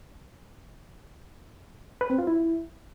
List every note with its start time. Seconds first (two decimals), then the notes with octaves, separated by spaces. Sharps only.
2.01 B4
2.10 C4
2.19 F4
2.27 E4